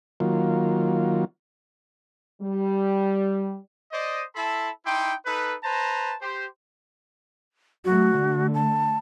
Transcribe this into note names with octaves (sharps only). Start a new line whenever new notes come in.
D#3 F#3 A#3 F4
G3
C5 D5 D#5
E4 A4 A5 B5 C6
D#4 E4 G5 C6 D6
D#4 A4 B4
B4 C5 A5 A#5
G4 C5
F#3 A3 F#4
D3 A3
A5